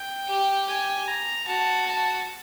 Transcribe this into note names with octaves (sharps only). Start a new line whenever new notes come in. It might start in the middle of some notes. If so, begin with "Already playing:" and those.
Already playing: G5
G4
G#5
A#5
F#4 A5
A5